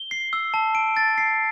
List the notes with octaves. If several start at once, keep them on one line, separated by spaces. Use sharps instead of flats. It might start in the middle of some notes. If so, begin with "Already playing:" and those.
Already playing: G7
C7
E6
A5
D7
A6
C7